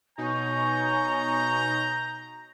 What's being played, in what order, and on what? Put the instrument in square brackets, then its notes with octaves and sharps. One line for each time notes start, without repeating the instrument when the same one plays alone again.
[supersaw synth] B2 D#4 [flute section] C#5 G#5 C#6 [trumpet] A#5 [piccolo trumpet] G6